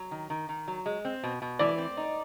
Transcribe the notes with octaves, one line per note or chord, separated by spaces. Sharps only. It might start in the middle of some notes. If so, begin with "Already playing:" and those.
Already playing: F#3
D#3
D#3
D#3
F#3
G#3
C4
B2
B2
E3 D5
C4
D#4